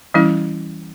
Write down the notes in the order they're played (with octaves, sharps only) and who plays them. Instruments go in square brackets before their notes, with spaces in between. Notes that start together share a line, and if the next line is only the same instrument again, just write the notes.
[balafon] E3 G3 C#4 E4